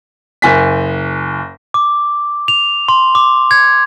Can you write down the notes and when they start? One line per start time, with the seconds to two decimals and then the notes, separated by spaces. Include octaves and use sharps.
0.42 F#1 G#5 B6
1.74 D6
2.48 F7
2.88 C6
3.15 D6
3.51 G#6